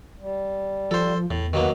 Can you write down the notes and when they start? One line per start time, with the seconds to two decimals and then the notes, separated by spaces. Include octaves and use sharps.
0.19 G3
0.91 F3 A4 C5
1.31 E2 A2
1.53 D#3 F#3 A#3 B3 B4